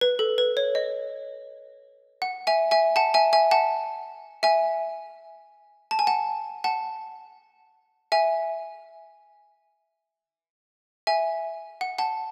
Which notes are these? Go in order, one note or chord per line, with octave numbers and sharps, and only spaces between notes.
B4
A4
B4
C#5
D#5
F#5
E5 G#5
E5 G#5
F#5 A5
E5 G#5
E5 G#5
F#5 A5
E5 G#5
A5
G#5
F#5 A5
F#5 A5
E5 G#5
E5 G#5
F#5
F#5 A5